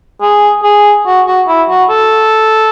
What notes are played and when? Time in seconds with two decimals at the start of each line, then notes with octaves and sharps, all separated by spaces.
0.22 G#4
0.64 G#4
1.07 F#4
1.27 F#4
1.48 E4
1.69 F#4
1.90 A4